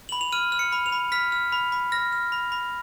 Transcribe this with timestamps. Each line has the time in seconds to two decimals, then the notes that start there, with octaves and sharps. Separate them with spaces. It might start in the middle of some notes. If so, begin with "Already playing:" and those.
0.09 B5 F#7
0.21 F7
0.32 F6 D#7
0.52 F6
0.59 C#7
0.72 B5
0.86 F7
0.92 B5
1.12 F6 B6
1.32 F6
1.52 B5
1.72 B5
1.92 F6 A#6
2.12 F6
2.32 B5
2.52 B5